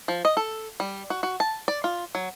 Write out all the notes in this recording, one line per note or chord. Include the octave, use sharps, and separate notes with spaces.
F3
D#5
A4
G3
F#4
F#4
A5
D5
F4
F#3